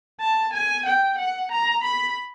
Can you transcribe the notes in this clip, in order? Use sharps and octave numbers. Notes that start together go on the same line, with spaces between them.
A5
G#5
G5
F#5
A#5
B5